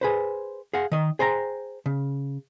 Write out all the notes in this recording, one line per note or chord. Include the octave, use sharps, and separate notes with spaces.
G#4 B4 C5
G#4 F5 F#5
D#3 D#5
G#4 C5 G5 A5 A#5
C#3